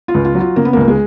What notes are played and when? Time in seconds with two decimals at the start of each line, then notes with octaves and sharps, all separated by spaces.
0.08 F4
0.14 C#2
0.25 F4
0.35 F#3
0.40 F4
0.56 C#3 A#3
0.65 B3
0.73 C#2 A#3
0.88 G#3